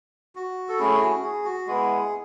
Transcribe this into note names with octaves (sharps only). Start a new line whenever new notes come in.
F#4
A4
A3 C#4 E4 G#4
F#4
G#4
F#4
G#3 B3 E4 G#4